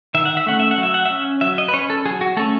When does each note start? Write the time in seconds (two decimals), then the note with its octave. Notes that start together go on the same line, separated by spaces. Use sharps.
0.14 D#3 E5
0.25 F#5
0.37 E5
0.46 A3 C#4 F#5
0.60 E5
0.71 F#5
0.78 F#3
0.83 E5
0.94 F#5
1.06 C#4 E5
1.41 F#3 E5
1.58 D#5
1.68 B4
1.73 C#4 C#5
1.90 A4
2.06 F#3 G#4
2.21 F#4
2.37 A3 C#4 A4